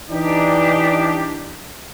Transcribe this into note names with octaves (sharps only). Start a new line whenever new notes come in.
E3 D4 D#4 G4